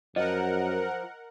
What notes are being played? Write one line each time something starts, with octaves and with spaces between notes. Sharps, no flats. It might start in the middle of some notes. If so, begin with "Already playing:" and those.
F#2 F3 A#4 D#5 F#5